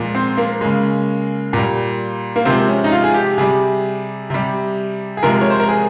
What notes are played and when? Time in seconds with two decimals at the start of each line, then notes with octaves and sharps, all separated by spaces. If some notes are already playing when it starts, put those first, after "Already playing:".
Already playing: A#2 F3 G#3
0.15 C4
0.37 A#3
0.61 C#3 G#3
1.53 A#2 G3
2.36 A#3
2.45 C3 F3 G#3 C4
2.68 C#4
2.84 D#4
2.92 F4
3.04 G#4
3.14 G4
3.38 C3 G3 G#4
4.30 C3 G3
5.17 G#4
5.23 C3 F3 G#3 A#4
5.41 C#5
5.50 C5
5.60 A#4
5.69 G#4